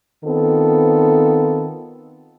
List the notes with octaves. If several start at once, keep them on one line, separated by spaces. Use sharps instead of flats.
D#3 B3 C4 F4 A4